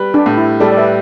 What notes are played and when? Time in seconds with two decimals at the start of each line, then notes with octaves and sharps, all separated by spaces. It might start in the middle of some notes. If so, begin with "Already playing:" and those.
Already playing: G3 B4
0.14 D4 G4
0.26 A2
0.37 E4
0.60 G3 A4 D5
0.72 D5
0.77 B4 E5